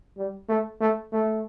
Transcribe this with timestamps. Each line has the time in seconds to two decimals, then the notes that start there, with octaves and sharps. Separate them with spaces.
0.17 G3
0.49 A3
0.80 A3
1.12 A3